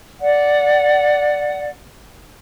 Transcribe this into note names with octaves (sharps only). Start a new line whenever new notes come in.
D5 F#5